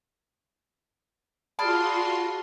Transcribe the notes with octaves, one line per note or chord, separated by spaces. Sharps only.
F4 F#4 G#4 D5 A5 B5 C6 F6